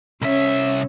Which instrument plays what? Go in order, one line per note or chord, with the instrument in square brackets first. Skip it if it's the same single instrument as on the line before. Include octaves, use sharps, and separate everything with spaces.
[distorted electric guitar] C2 E5 [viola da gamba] C#4